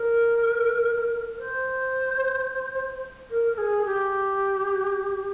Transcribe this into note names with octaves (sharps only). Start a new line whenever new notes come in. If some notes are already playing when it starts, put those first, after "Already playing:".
Already playing: A#4
C5
A#4
A#4
G#4
G4